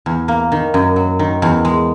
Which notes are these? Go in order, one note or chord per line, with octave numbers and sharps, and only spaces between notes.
E2
A#3
D#3
F#2
F#3
D#3
E2
G#3